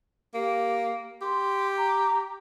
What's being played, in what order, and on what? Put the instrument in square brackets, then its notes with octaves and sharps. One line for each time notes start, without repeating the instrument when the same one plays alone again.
[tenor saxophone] A#3 [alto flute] G4
[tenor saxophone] G4 [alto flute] C6
[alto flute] A#5